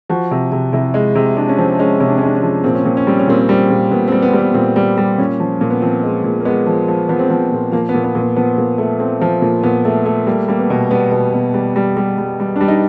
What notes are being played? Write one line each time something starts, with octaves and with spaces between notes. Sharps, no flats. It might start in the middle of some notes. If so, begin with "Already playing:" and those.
F3 F#4
C3
C3
C3 E4
G#3
C3
G#3 D4
C#4
F3 C4
G#3 C#4
C3 C#4
D4
C#4
G#3
D4
C#4
F3
A#2 C4
C#4
A#2 C4
C#4
G3 C4
C#4
A#2 C4
C#4
G3 C4
A#2
A#2 B3
C4
G3
B3
G3
B3
A#2 C4
G3
G3
A#2 C#4
F3
A#2
B3
F3 C4
G#3
A#2
A#3
G#3 B3
F3
F3
F3 B3
C4
F3 B3
A#2
F3 A#3
B3
A#2
B3
A#2
B3
F3 B3
A#2
A3
A3 C4
F3
A#2
A#2 B3
A3
A3
G3 A#3
G3 A#3
B3
B2
G3 B3
B2
B2
G3
G3
G3
G3
G3
G3 D4
D#4